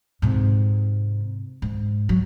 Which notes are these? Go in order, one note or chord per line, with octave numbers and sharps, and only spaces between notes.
G#2 C3
G#2
F#3